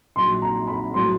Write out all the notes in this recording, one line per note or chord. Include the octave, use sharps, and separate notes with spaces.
A#1 A#2 F#3 C6
A#5
B5
A2 F#3 C6